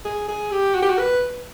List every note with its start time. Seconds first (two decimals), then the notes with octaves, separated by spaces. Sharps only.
0.05 G#4
0.28 G#4
0.52 G4
0.75 F#4
0.83 G4
0.90 F#4
0.99 B4